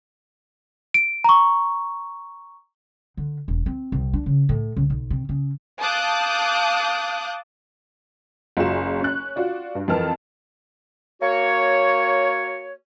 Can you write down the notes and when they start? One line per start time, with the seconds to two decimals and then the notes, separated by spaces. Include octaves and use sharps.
0.94 D7
1.24 A#5 C#6
3.17 D3
3.48 E1
3.66 C4
3.92 C2
4.13 D4
4.26 C#3
4.49 A2
4.76 C#2
4.90 B1
5.10 C3
5.29 C#3
5.81 F5 A5 D6 D#6 F#6 G6
8.57 F#1 F4 F#4 G#4 E7
9.00 C#4 F#6
9.36 F4 F#4 D5
9.75 G2
9.88 F2 E3 A#4 A5 F6
11.22 A#3 F#4 C#5